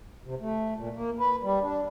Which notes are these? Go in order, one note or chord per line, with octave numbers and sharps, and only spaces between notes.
C3
A3
A#2
A#3
B4
G3
D4